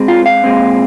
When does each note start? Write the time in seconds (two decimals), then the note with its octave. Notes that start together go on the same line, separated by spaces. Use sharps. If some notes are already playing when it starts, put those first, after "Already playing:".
Already playing: G#2 G#3 C4
0.08 F4
0.26 F5
0.44 A#2 G#3 C4